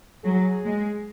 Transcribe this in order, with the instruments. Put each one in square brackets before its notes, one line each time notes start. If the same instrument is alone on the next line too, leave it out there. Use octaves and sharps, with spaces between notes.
[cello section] F#3 [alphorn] G#4
[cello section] G#3